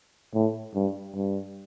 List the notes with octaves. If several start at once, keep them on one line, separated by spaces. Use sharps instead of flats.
A2
G2
G2